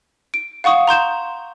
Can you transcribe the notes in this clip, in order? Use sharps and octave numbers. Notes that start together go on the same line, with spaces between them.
D7
F5 F#5 C#6 D#6
A#5 C6 G6 E7